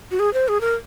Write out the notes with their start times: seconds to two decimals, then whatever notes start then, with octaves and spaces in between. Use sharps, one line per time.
0.11 F#4
0.19 G#4
0.34 C5
0.48 G#4
0.61 A#4